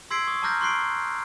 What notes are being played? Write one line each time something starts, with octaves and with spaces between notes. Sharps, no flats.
C6 E6 G#6 B6 C7 D7
C#6 D#6
A5 A#5 D6 F6 G6 A#6
C6 C#6 F#6 C7 D7